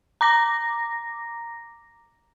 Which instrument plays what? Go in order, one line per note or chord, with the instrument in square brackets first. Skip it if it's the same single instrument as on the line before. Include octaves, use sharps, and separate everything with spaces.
[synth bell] A#5 D6 A#6